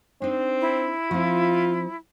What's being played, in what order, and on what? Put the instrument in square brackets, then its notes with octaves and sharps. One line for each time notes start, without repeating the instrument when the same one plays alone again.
[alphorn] C4 [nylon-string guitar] D4 D#4
[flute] E4
[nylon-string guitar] F3 C4 [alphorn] F4